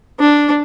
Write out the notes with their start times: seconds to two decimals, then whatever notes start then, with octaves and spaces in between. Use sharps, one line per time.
0.19 D4